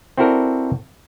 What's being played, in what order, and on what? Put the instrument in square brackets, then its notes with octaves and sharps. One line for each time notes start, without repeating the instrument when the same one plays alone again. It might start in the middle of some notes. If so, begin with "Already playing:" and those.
[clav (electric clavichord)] C4 E4 F#4 A4 A#4 D5